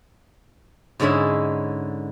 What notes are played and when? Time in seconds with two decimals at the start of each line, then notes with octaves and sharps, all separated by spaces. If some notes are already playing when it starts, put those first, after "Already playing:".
1.00 G#2 D3 G#3 C#4 E4 E5